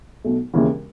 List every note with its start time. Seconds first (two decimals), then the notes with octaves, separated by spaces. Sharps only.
0.24 B1 B2 A3
0.54 E1 D#2 C#3 E3